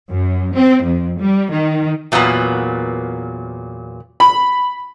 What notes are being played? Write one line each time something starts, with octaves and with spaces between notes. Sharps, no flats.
F#2
C4
F2
G3
D#3
E2 A#2 F#3 A#3 B3
B5